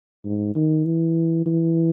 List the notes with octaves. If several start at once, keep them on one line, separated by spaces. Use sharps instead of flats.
G#2
D#3
E3
E3